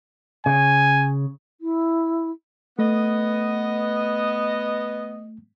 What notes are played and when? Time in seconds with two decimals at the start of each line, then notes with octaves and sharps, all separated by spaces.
0.46 C#3 G#5
1.61 E4
2.79 A3 B3 D#5